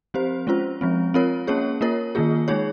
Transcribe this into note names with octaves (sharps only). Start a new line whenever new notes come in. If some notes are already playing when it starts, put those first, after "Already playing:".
F3 C4 G4 C5
G#3 C#4 F4 C5
F3 G#3 C4
C4 F4 A#4 C#5
A#3 C#4 G#4 C#5
A#3 F4 A#4 C#5
D#3 A#3 F4 G#4
G#3 D#4 G#4 C#5